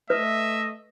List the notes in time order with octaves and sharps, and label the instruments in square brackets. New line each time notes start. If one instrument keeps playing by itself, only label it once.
[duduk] A3 [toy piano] B4 [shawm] D#5 [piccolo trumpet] E5